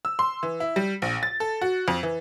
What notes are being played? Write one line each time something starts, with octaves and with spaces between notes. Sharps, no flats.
E6
C6
E3
E4
G3
A#1
A6
A4
F#4
F2
E3